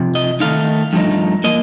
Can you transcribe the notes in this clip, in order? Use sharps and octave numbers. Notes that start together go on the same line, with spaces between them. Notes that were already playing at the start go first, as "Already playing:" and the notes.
Already playing: F2 C3
D#5
D#3 A3 D#4 F5
G2 F3 A3 D#4
F3 A#3 D#5